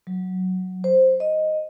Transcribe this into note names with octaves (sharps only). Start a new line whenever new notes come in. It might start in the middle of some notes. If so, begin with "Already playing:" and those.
F#3
C5
D#5